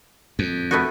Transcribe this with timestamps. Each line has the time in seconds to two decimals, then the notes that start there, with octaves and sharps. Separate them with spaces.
0.39 F2
0.71 A3 B3 F#4